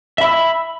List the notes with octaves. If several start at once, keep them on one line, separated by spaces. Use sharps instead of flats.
E5 B5 E6